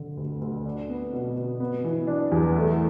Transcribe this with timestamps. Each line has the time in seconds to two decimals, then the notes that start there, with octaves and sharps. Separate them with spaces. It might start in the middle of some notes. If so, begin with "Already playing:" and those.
Already playing: D3
0.17 D2
0.41 D2
0.65 D4
0.88 B3
1.13 B2
1.36 B2
1.60 B3
1.84 E3
2.07 D4
2.32 E2
2.56 A3